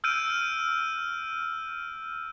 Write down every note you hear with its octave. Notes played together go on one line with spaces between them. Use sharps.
E6 F6 G6 D7 D#7